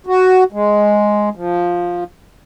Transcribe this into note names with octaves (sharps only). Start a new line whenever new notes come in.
F#4
G#3
F3